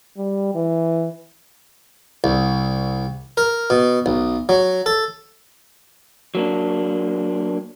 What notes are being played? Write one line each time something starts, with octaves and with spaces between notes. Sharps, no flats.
G3
E3
C2
A#4
B2
B1
F#3
A4
F#3 A#3 D4